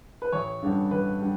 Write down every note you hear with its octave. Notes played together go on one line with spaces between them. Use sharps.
B4
A1 C#5
G2 D3 G3 C#4
A1 B4
D3 G3